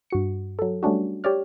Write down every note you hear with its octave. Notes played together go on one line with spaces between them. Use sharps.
G2 F#4 C#7
F#3 A4
G3 A3 C#4 D4 F#4
G4 C#5 D5 F6